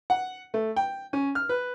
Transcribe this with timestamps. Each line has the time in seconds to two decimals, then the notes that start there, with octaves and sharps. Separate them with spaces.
0.10 F#5
0.54 A3
0.76 G5
1.13 C#4
1.35 F6
1.49 B4